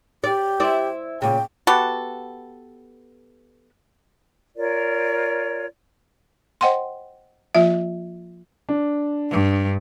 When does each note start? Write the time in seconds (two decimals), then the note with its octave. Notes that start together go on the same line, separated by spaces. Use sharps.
0.24 G4 D5
0.60 E4 C5 D5
1.22 A#2 C#3 G5
1.67 B3 F#4 G4 A4
4.56 F4 A#4 C#5 D5
6.61 C5 D#5 F#5 G5 C6
7.55 F3 A#3 F4 E5
8.69 D4
9.31 G2